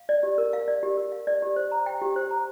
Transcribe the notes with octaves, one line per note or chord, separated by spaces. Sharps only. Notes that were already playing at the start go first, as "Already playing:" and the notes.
Already playing: F5
D5
G4
A#4
F5
D5
G4
A#4
F5
D5
G4
C5
A#5
G5
G4
C5
A#5